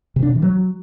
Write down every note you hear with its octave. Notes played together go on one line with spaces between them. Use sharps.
C3
D4
B2
E3
F#3